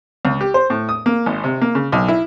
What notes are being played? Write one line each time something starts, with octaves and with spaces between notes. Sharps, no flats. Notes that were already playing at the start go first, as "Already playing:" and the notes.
C#2
G4
C5
A2
D#6
A#3
G#1
C3
A#3
C#3
B1
E4